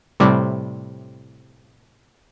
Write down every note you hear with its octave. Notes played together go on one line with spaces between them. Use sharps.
A2 C3 G3